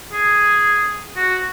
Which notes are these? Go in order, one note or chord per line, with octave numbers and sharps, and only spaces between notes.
G#4
F#4